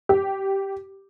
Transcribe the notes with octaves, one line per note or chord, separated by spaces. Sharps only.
G4